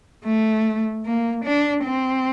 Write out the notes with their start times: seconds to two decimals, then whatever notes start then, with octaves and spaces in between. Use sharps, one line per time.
0.24 A3
1.05 A#3
1.45 D4
1.84 C4